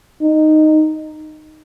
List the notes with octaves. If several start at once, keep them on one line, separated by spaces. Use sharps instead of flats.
D#4